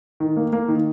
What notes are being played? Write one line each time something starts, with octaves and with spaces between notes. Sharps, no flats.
D#3
A#3
A#3
D#3